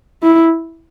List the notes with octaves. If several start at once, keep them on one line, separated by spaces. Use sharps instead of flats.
E4